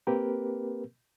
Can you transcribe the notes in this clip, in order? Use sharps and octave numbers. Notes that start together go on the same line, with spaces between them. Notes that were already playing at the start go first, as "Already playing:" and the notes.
A#3 C4 G4 A#4 B4